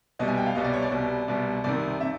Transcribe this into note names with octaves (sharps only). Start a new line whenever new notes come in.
C2 B2 G3 D#5
G#5
G5
F5
C2 B2 G3 D#5
D5
C#5
D5
C2 B2 G3
C2 B2 G3
C2 C3 D#3 D5
C3 E5